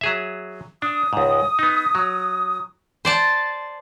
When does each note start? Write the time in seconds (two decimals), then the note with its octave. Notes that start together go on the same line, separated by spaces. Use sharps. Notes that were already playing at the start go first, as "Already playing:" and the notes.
0.01 F#3 G#4 E5
0.82 D4 D#6
1.13 C#2 G#2
1.59 B3 D#4
1.95 F#3
3.05 C5 D5 A5